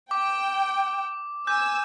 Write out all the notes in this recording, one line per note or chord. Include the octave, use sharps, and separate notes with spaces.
G5 D6
G#5 D6 E6 G6